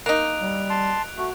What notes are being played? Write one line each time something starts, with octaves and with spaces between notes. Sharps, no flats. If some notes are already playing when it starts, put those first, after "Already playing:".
A#3 D#4 F#6 D7 F7
G3
A5 C6
A3 F#4